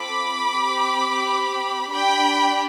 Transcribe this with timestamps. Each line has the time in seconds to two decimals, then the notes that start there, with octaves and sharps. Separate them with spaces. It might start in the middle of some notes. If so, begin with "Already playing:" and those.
Already playing: C4 F4 A4 B5 D6
0.54 C4 G4
1.92 D4 G4 G5 B5